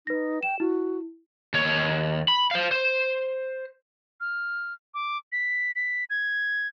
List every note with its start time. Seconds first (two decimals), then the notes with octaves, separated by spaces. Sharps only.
0.07 D#4 B4 A#6
0.43 G5 E7
0.60 E4 F#4
1.54 D#2 C#5
2.28 B5
2.51 C5 F5
2.71 C5
4.21 F6
4.94 D6
5.32 B6
5.76 B6
6.10 G#6